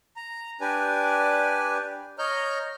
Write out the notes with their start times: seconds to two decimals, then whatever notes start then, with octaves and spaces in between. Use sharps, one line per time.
0.16 A#5
0.61 D4 G4 B4 D5 G#5
2.18 C#5 D#5 A#5 F6 G6